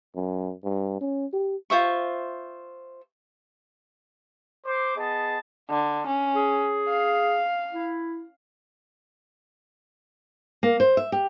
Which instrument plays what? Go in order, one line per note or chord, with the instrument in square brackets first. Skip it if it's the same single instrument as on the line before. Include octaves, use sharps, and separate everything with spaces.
[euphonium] F#2
G2
C#4
G4
[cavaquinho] F4 C5 E5 C#6
[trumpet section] C5 D6
B3 G#4 D#5 A5
[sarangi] D3
C#4
[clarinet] G#4
[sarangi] F5
[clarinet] E4
[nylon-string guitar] A#3
C5
E5
G4